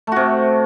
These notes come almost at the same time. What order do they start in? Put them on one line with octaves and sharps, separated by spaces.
A3 F#4 C3